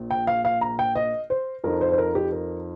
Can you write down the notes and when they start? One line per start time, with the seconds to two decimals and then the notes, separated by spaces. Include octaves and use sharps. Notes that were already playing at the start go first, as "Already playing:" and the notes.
Already playing: A#1 A#2
0.11 G5
0.27 F5
0.45 F5
0.61 A#5
0.79 G5
0.96 D#5
1.30 C5
1.64 F2 F3 D#4 A#4
1.81 C5
1.92 C5
1.98 A#4
2.15 G4
2.32 A#4